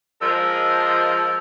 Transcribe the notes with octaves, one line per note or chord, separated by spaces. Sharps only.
F3 G#3 A#4 E6